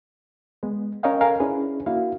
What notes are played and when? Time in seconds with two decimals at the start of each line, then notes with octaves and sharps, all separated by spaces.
0.63 G#3 B3
1.03 C#4 A#4 C#5 D#5 F5 G5
1.21 A4 A#4 F5 G#5
1.40 C#4 D4 E4 G#4 B4
1.86 A#3 D4 E4 F#4 F5